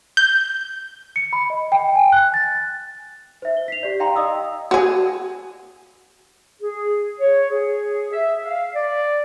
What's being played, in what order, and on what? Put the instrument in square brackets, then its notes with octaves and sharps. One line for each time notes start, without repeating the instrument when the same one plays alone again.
[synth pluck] G6
[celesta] C#7
B5
D#5
G5
G#5
F#6
A6
C5 E5
G7
B6 C7 F7
G4 D5
F5 G5 A#5 C6
D#5 F5 D#6 E6
[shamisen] F#4 G#4
[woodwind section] G#4
C#5
G#4
E5
F5
D5